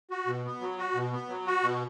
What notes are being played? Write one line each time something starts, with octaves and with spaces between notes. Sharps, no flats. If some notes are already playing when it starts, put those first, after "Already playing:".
F#4
B2
B3
F#3
F#4
B2
B3
F#3
F#4
B2